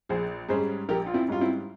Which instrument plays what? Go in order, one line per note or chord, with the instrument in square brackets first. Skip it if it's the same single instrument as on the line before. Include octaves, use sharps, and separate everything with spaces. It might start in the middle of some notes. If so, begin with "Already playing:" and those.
[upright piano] A#1 [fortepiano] G#4 C5
[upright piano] G#2 G3 C#4 [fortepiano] G#4 C5
[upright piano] A#1 [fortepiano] G4 A#4
[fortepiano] F4
C4 E4
[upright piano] G#2 G3 C#4 [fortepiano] F4
[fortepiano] C4 E4